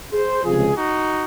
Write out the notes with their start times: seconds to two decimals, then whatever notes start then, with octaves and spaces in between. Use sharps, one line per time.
0.12 G#4 C5
0.44 C#2 C3 F3 F4 G#4
0.77 D#4 F#4